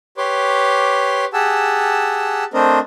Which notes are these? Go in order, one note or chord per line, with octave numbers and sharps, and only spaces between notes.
G4 B4 C#5 C6 D6
G4 G#4 F#5 A5 E6
A3 C4 D4 A#4 C5 D#5